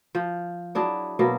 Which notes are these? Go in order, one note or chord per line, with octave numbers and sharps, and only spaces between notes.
F3
F#3 D4 E4 G#4
B2 F#3 A#3